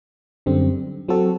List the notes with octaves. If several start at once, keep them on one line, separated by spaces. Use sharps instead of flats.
F#2 D3 G3 C4
F#3 C4 F#4 A4